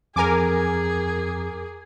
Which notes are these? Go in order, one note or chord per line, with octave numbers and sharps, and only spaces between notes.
F2 G#4 A#4 G#5 D6